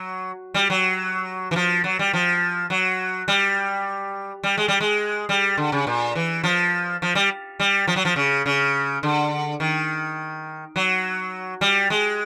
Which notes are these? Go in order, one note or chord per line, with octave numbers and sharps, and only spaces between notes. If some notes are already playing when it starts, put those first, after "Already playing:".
Already playing: F#3
G3
F#3
E3
F3
F#3
G3
F3
F#3
G3
G3
G#3
G3
G#3
G3
D3
C#3
A#2
E3
F3
F3
G3
G3
F3
F#3
F3
C#3
C#3
D3
D#3
F#3
G3
G#3